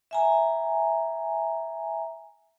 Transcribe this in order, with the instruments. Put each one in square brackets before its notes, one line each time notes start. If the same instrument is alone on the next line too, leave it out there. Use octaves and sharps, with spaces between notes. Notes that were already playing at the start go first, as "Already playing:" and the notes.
[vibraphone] E5 G#5 A#5